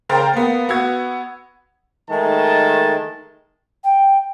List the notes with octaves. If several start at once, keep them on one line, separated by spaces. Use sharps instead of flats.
C#3 A#4 C5 G5 F6 A6
A#3 B3
B3 F#4 E6 G#6
D#3 G#3 A3 A5
G5